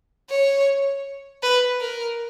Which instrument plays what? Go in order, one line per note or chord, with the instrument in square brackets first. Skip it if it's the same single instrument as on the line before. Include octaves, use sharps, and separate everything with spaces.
[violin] C#5
B4
A#4